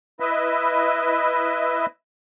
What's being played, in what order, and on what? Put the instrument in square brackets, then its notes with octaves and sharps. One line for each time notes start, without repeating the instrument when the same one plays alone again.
[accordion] E4 B4 D#5 E5